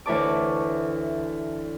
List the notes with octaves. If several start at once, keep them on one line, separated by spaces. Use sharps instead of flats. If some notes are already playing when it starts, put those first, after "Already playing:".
D2 E3 B4 C#5 A5 D6